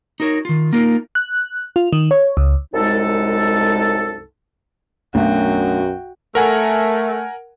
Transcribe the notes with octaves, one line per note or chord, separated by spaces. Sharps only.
D#4 F#4 A#4 C#5
D#3 F4
A#3 D#4 F4 A#4
F#6
F4
D#3
C#5
C#2
C2 F#2 G#3 D#4 A4
B1 F#2 A3 D4 F#4 G5
A3 A#4 F#5 G#5